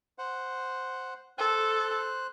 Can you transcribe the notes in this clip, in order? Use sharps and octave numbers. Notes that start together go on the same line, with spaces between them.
C5 F#5
A4 C5 F#6